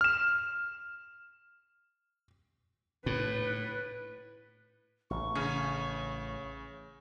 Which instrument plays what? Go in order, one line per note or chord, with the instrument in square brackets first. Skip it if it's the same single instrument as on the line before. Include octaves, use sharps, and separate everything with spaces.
[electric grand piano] F6 E7
[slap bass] A2 [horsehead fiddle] B4
[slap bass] A1 [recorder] C#6
[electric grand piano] C#3 [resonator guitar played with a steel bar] C#4